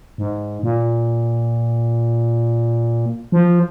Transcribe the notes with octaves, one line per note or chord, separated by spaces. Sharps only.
G#2
A#2
F3